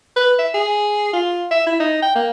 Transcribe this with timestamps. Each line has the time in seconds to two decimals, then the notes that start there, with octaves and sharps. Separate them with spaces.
0.16 B4
0.39 E5
0.54 G#4
1.13 F4
1.51 E5
1.67 E4
1.80 D#4
2.02 G5
2.16 A#3